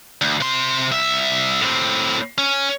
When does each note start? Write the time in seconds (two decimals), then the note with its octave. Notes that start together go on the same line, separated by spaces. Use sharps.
0.21 D2
0.40 C3 C6
0.92 C2 E5
1.62 A2 C4
2.38 C#4